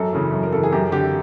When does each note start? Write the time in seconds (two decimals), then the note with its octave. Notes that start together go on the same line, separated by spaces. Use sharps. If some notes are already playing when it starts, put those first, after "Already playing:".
Already playing: F#2 A4
0.13 C#3 E3
0.32 F#2
0.43 A#4
0.52 C#3 E3 A4
0.63 G#4
0.72 F#2 G4
0.92 D3 G4